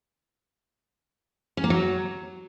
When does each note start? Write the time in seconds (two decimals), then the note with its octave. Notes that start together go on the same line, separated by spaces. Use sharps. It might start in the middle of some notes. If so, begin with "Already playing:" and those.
1.57 C#4
1.64 A#3
1.70 F#3